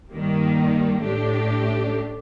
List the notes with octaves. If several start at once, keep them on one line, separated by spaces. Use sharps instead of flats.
G2 D#3 G3 A#3
A2 A3 D4 G4